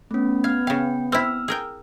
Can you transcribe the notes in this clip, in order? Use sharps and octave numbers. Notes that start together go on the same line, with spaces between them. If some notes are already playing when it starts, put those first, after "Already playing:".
A3 B3 C#4
F5 F6 G#6
C#3 F5 G5
C4 E4 E6 F6
G#4 A#4 G5